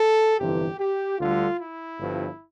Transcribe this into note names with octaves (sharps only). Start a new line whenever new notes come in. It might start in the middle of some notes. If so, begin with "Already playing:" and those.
Already playing: A4
G1 F2 C3 E3 G4
G4
D2 D3 G3 F4
E4
G1 G2 F3